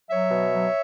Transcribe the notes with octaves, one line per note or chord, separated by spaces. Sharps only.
F#3 C#5 E5
B2
F#3